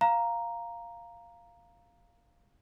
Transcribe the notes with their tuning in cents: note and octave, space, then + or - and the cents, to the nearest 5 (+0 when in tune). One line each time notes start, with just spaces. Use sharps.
F5 +0 A#5 +0